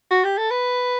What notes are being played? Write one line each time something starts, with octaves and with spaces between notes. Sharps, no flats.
F#4
G4
A4
B4